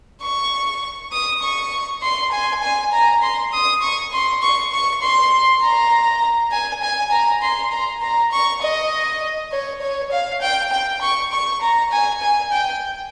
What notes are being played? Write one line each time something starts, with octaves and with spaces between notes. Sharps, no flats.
C#6
D#6
C#6
C6
G#5
G#5
A#5
C6
D#6
C#6
C6
C#6
C#6
C6
A#5
G#5
G#5
A#5
C6
A#5
A#5
C#6
D#5
C#5
C#5
F5
G5
G5
C#6
C#6
A#5
G#5
G#5
G5